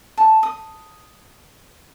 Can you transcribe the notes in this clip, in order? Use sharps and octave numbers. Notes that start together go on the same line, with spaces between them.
A5
D#6